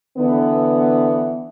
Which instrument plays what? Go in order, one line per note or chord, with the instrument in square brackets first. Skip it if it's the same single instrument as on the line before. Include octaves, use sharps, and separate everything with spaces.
[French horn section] D3 E3 B3